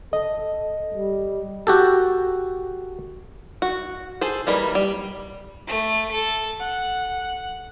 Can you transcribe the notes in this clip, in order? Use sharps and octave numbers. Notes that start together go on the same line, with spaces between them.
A4 D#5
G3
F#4 G4 A4
F#4
G#4 A4 C5
E3 G3 A#3 D#4
G3
A3
A4
F#5